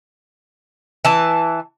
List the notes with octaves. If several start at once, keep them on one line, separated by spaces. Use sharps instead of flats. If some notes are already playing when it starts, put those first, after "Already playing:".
E3 A5